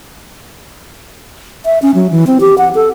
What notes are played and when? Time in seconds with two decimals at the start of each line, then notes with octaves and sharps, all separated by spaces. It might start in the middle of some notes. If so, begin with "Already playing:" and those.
1.65 E5
1.82 C#4
1.95 F#3
2.11 E3
2.27 C4
2.40 G4
2.58 F#5
2.75 A4